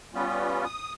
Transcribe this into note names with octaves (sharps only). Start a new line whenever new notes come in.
G3 B3 C#4 F4
D#6